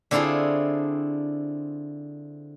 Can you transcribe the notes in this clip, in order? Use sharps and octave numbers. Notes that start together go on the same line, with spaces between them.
D3 C4 D4 E4 F4 G#4